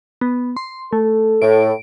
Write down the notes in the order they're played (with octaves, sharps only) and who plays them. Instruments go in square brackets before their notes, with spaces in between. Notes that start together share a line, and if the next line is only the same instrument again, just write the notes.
[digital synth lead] B3
C6
[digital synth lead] A3 [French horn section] A4
[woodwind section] A2 [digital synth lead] D7